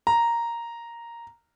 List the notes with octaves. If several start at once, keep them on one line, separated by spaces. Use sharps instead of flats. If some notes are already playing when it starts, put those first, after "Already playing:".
A#5